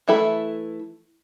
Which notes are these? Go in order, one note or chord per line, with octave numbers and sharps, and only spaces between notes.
E3 A3 E4 A4 B5